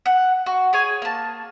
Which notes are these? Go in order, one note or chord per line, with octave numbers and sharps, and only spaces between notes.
F#5
F#4
G#4 C#5 G#5
A#3 A5